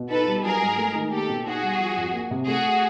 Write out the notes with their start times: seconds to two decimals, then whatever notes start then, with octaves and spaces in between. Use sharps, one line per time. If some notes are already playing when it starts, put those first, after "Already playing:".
Already playing: B2
0.10 D#4 A4 B4
0.27 G3
0.44 F#3 G#4 A#4
0.61 G#2
0.78 A3
0.95 D#3
1.12 A#3 G4 A4
1.29 B2
1.46 D#4 F#4 G#4
1.63 G3
1.80 F3
1.97 F2
2.14 A#3
2.31 C3
2.47 A3 F#4 G#4